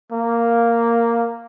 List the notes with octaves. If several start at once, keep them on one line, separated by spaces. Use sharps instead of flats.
A#3